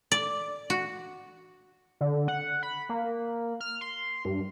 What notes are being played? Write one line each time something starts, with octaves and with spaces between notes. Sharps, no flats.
D5
F#4
D3
F#5
B5
A#3
F6
C6
G2